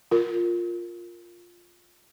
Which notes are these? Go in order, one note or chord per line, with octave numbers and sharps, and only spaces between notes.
F4 A#4